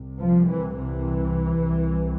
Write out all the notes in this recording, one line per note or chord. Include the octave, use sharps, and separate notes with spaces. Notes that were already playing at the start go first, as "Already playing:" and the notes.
Already playing: C2 C3
F3
E3
E3
C2 C3